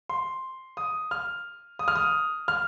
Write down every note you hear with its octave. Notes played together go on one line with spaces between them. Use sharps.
C6
D#6
F6
D#6
F6
D#6
F6